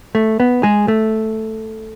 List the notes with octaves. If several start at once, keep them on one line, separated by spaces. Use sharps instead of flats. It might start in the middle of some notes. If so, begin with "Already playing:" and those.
A3
B3
G#3 G#4
A3